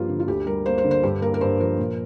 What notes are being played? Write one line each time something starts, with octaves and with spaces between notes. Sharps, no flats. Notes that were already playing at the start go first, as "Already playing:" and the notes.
Already playing: G2 F3 A#3 F4 G4 A#4 C5
D3
F4
D2 G4
G3 A#4
A#3 C5
C5
D3
C5
G2 G4
A#3 A#4
A#4
G2 C5
F3 A#4
A#2